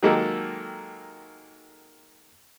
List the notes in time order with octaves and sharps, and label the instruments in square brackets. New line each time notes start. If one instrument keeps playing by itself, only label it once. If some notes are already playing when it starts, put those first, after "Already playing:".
[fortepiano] D#3 F#3 G#3 A#3 G4 A4